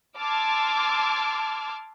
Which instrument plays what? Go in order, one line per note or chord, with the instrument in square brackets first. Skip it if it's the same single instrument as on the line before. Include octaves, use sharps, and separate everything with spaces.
[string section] A5 C6 D6 E6 F6 G#6